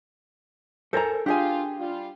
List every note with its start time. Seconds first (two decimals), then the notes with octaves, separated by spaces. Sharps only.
0.93 A4 A#4 C5 G#5 A#5
1.26 D4 F4 G4 G#4 G#5
1.79 G3 F4